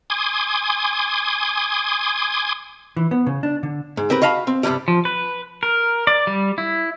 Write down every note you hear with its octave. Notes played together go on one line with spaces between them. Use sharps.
G#5 C6 D6 D#6 G#6
E3
B3
C#3
D4
D3
G#2
C4 G4 A#4 B4
F#4 D#5 F5 A5 B5
C4
G2 C3 E3 F#3 G3
F3
B4
A#4
D5
G3
E4